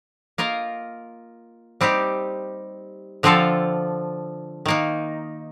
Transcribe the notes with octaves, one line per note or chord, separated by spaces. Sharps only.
A#3 F4 A#4 D#5
G3 C4 D#4 G4
D3 F3 C4 F4 A4
D#3 A#3 D#4